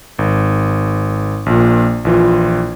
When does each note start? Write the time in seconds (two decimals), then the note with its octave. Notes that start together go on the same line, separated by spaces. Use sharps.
0.19 G#1
1.46 A#1 A#2
2.05 A#1 E3 F4